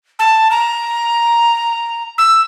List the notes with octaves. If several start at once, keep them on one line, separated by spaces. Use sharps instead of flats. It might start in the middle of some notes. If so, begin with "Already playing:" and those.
A5
A#5
E6